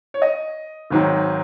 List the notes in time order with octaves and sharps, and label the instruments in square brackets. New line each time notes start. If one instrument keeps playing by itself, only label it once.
[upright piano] C#5
D#5
G#1 G#2 D#3 F#3